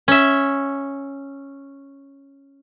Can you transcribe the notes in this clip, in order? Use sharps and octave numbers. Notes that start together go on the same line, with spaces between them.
C#4 E5